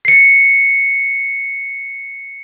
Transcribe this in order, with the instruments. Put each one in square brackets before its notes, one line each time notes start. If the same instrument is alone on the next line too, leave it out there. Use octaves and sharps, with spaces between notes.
[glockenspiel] C7 C#7